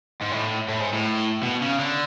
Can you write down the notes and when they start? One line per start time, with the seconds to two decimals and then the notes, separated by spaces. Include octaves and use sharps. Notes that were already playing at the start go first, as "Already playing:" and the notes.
0.21 G#2
0.31 A2
0.69 A2
0.80 G#2
0.93 A2
1.43 B2
1.62 C#3
1.80 D3